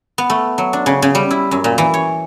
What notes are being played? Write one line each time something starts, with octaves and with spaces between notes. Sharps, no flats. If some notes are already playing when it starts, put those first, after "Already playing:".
B3
A3
F#3
D4
C#3
C#3
G3
E4
F#2
A#2
E3
C#5